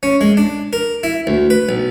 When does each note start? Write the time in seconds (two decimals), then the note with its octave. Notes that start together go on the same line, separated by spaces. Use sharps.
0.03 C#4
0.21 G#3
0.37 D4
0.73 A#4
1.03 E4
1.27 D2
1.50 B4
1.69 B1